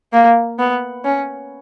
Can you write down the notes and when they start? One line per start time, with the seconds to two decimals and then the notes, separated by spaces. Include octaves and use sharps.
0.13 A#3
0.59 B3
1.05 C#4